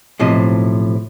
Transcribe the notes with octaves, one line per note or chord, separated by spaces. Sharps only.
B1 A2 C3 F3 D#5